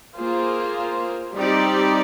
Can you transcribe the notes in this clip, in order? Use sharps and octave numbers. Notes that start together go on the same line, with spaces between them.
A#3 F4 G#4 C5
G3 C4 D#4 G4 D5